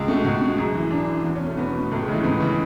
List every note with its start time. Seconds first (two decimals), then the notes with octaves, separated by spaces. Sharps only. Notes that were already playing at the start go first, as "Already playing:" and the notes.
Already playing: C#2 G#3
0.08 B2 A3
0.24 C#2 F#4
0.41 B2
0.58 F#2 G#4
0.75 E3
0.91 F#2 D4
1.08 E3
1.24 E2
1.36 C#4
1.41 B2
1.46 A3
1.57 E2 B3
1.74 B2
1.91 C#2 A3
2.02 G#3
2.08 C#3 E3 A3
2.23 C#2 B3
2.40 C#3 E3